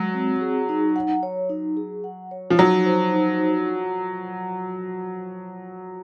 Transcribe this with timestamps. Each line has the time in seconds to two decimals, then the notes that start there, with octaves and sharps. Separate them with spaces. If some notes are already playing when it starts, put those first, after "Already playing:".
Already playing: F#3 G#3
0.14 C4
0.41 G#4
0.69 D#4
0.96 F#5
1.23 C#5
1.50 D#4
1.77 G#4
2.04 F#5
2.31 C#5
2.50 F3
2.59 F#3 D#4
2.86 C5
3.14 D#4